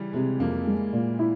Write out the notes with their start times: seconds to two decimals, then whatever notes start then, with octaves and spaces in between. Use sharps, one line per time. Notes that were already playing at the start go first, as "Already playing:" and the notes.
Already playing: C#3 E3 G3
0.13 C3 G#3
0.40 F2 A#3
0.67 G#3
0.93 A#2
1.19 E4